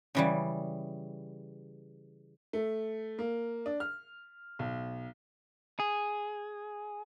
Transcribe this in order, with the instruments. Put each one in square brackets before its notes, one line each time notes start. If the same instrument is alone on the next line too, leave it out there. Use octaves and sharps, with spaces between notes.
[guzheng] C#3 E3 G3
[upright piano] A3
A#3
D4
F6
B1
[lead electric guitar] G#4